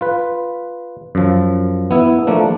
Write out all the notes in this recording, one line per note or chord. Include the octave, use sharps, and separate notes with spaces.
F4 B4
F#2 F3
B3 E4
F3 A3 A#3 D4